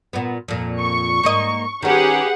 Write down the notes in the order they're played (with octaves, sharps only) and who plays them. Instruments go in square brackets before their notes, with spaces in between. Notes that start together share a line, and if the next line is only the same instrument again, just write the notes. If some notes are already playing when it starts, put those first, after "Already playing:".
[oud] A#2 B3
F2 A#2
[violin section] C#6
[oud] G#2 A#3 D#5
[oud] D#3 C#4 [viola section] G4 B4 [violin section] G#4 F#5